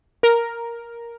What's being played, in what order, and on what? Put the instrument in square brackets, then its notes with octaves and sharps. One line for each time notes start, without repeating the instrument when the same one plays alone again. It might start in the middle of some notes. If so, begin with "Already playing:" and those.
[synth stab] A#4